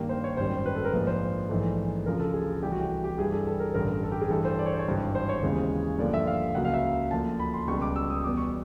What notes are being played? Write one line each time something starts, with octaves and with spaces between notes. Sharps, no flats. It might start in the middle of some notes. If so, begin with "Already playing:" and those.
Already playing: G2 D#3 G3 A#3
C5
C#5
G#1 F#2 D#3 G3 C5
B4
A4
A#4
A#1 G#2 F3 A#3 B4
C5
A#1 G#2 E3 A3
D2 C#3 F3 A#4
A4
G#4
C2 C3 E3 A3 G4
F#4
G4
G4
G2 E3 G3 G#4
A4
A4
A#4
A1 G2 D3 A#4
A4
G4
G#4
G2 E3 A3 A4
C5
D5
C#5
C5
C#5
G#1 G2 E3
C5
C#5
D#2 C#3 E3 G#3 B3
G2 D3 F3 A#3 D5
E5
F5
C#2 C#3 F#3 A#3 F#5
F5
E5
D2 D3 F3 A#3 A5
B5
C6
C#2 B2 G3 B3 C#6
D6
E6
D#6
E2 B2 G3 B3 D6
C#6